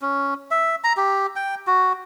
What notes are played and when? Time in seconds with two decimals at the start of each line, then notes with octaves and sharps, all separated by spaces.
0.02 C#4
0.51 E5
0.84 A#5
0.97 G4
1.36 G5
1.67 F#4